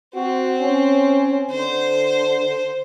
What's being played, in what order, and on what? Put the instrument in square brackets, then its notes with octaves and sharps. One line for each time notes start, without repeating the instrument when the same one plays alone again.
[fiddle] C4 [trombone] F#4
[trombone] C#4
[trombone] D3 [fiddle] C5